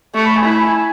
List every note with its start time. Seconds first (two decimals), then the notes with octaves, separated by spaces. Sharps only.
0.15 A3 C#6
0.26 B5
0.36 G#5
0.45 E4 B5
0.56 B5
0.66 G#5